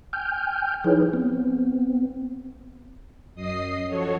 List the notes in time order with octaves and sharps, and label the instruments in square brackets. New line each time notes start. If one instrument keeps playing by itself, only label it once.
[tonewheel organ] G5 G#5 F6 G6
F3 D#4 E4 G#4 B4 C#5
B3 C4
[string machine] F#2 D#5 D#6 C7
F3 F#4 A4 C#5